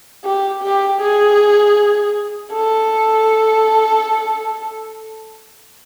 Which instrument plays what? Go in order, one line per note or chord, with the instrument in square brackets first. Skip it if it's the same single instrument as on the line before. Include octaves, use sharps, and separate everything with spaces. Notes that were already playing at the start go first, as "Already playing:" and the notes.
[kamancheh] G4
G4
G#4
A4